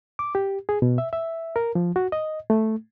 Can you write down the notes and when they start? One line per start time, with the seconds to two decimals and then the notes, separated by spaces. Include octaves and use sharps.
0.19 D6
0.35 G4
0.69 G#4
0.82 B2
0.98 E5
1.13 E5
1.56 A#4
1.75 F3
1.96 F#4
2.12 D#5
2.50 A3